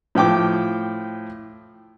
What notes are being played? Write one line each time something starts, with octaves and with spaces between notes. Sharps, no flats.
A2 F3 G5 D6